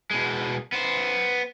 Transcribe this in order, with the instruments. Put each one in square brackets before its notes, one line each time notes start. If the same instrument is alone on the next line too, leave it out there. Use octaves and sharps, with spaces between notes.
[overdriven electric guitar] B2 G#3
B3 C5